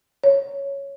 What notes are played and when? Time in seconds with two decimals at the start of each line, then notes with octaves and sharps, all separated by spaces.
0.24 C#5